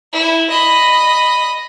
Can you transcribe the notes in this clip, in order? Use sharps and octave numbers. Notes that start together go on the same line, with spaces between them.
E4
D#5 B5